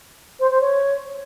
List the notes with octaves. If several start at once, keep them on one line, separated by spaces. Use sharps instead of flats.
C5
C5
C#5